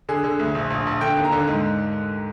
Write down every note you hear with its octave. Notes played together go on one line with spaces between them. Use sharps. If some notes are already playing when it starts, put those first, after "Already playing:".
D3 G#4
D3
D2
A#1
A#1
A#1
D3 G5
D#2
A#5
D3
G#2